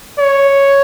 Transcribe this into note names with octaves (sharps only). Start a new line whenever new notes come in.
C#5